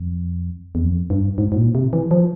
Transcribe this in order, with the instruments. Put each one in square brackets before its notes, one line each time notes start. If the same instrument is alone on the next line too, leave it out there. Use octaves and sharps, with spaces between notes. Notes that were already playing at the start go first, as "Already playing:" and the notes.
Already playing: [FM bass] F2
E2
F2
G2
G#2
G#2
A#2
C3
E3
F3